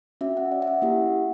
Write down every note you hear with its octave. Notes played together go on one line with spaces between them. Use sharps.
C#4 F#4 E5
F#5
D5
E5
F#5
A#3 E4 G4